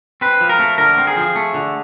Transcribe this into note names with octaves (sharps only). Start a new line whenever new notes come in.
C4 B4
F3
A#4
A3
D3 A#4
C4
G#4
F3
A3
D3